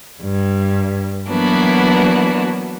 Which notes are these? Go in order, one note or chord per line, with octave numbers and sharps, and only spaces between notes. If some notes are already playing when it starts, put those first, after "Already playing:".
G2
E3 F#3 A#3 B3 D4 F#4